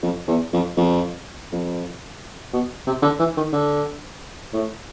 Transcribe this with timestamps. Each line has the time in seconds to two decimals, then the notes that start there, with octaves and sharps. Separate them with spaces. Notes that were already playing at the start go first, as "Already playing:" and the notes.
0.03 F2
0.28 E2
0.53 F2
0.77 F2
1.52 F2
2.53 B2
2.87 C3
3.02 D3
3.19 E3
3.37 D#3
3.53 D3
4.53 A2